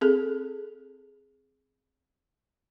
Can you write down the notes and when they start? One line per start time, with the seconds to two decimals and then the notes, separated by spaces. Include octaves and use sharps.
0.01 C4 G#4 A4